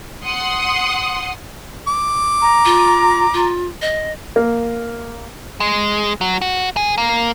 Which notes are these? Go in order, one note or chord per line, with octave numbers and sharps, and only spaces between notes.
F#5 C6 D#6
D6
A#5
F4
F4
D#5
A#3
G#3
F#3
F#4
G#4
A#3